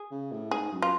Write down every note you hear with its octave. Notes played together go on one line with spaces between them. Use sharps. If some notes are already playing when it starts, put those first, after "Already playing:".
Already playing: G#4
C#3
A2
G#2 G#4
F#2
F4